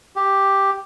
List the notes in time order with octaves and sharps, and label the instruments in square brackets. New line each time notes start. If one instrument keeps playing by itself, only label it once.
[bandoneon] G4